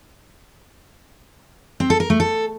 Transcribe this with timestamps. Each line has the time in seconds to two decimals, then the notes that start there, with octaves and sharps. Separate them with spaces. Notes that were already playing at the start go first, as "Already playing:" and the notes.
1.80 C4
1.90 A4
2.00 A#4
2.10 A3
2.20 A4